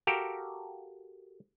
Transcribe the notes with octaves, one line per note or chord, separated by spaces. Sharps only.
F#4 G4 A4 A#4 F5 G5